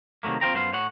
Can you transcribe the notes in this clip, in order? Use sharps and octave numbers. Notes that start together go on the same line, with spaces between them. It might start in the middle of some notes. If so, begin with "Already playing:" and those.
C3 D#3 F#3 A3 A#3
C4 F4 C5 G5 A#5
F#2 B3 C5 F5
A2 C#5 F#5